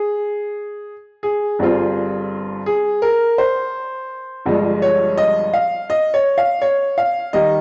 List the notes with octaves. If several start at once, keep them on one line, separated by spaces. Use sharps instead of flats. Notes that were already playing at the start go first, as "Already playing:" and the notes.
Already playing: G#4
G#4
G1 G2 G3 C4 F4
G#4
A#4
C5
G1 G2 F3 G#3
C#5
D#5
F5
D#5
C#5
F5
C#5
F5
D#3 G3 D#5